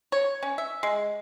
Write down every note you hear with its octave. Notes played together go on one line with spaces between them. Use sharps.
C#5
C#4
E5
G#3